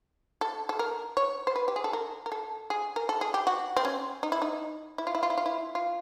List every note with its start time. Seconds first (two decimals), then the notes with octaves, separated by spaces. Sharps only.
0.41 A4
0.69 A4
0.79 A#4
1.17 C#5
1.47 C5
1.56 B4
1.68 G4
1.76 G#4
1.84 A4
1.93 A#4
2.26 A#4
2.32 A4
2.70 G#4
2.96 A#4
3.09 A4
3.21 G#4
3.34 G4
3.47 F#4
3.76 C4
3.85 C#4
4.23 D#4
4.32 E4
4.42 D#4
4.98 E4
5.07 F4
5.15 E4
5.23 F4
5.30 E4
5.38 F4
5.46 E4
5.75 F4